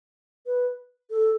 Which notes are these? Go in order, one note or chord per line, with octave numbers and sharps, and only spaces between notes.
B4
A4